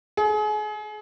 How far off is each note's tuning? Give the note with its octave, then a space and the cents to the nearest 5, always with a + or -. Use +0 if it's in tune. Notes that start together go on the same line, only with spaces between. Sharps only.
G#4 +35